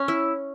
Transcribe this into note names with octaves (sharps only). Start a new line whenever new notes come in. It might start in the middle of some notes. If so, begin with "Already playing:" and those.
Already playing: C#4
E4